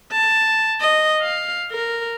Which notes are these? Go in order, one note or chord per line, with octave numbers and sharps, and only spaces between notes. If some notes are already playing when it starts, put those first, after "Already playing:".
A5
D#5
F5
A#4